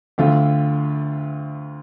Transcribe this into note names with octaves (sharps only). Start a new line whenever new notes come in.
D2 D3 A3 C4 F4